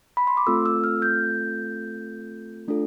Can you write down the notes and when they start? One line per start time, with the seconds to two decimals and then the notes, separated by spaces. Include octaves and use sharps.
0.17 B5
0.27 C6
0.37 D6
0.47 A3 C4 F4 A4 E6
0.66 E6
0.84 F6
1.02 G6
2.68 A3 D4 F4 A4